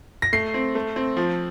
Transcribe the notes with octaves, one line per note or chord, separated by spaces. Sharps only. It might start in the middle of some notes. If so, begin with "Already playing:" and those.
A#6
A3 C7
C4
A3
C4
F3